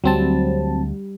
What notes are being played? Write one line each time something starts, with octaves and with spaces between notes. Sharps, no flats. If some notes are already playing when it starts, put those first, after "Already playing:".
D2 F#3 G3 C4 A5